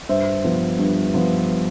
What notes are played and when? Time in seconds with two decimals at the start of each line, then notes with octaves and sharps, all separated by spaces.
0.09 G2 C5 E5
0.44 F3 B3
0.79 G2
1.14 F3 B3